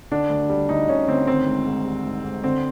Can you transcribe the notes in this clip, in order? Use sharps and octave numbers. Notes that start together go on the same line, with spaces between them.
D3 D4
D2
G3
D2 D#4
D3 C#4
D2 C4
D#3 C4
G#2
G#2
G3
G#2
G#2
D3 C4